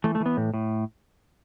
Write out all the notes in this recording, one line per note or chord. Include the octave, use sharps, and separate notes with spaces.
E3 A3
A3
E3
B3
A2
A2